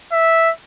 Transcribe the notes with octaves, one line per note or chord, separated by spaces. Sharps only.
E5